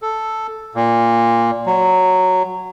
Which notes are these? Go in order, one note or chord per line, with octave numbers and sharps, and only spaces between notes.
A4
A#2
F#3